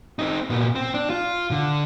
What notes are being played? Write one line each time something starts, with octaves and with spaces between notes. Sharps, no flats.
C4 D#4
A#2 B3
C4
D4
F4
D3